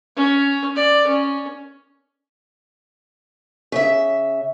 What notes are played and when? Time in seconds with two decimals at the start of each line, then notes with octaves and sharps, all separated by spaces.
0.16 C#4
0.76 D5
1.07 C#4
3.72 C#3 E5